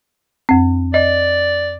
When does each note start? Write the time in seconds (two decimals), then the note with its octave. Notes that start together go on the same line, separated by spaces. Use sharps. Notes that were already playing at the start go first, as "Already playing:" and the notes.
0.49 F2 C4
0.94 D5 D#5